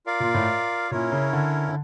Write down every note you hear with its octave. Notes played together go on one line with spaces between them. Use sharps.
F4 A#4 D5 F5
A#2
A2
A#2 C#4 E4 A#4 C#5
C#3
D3
D3